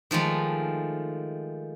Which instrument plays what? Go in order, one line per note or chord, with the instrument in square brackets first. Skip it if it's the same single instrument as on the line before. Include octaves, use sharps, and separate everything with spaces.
[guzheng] D#3 F3 G#3 A3